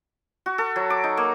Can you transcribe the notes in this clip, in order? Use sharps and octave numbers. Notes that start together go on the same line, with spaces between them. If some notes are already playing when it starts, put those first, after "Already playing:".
F#4
A4
F#3
D6
D#4
A#3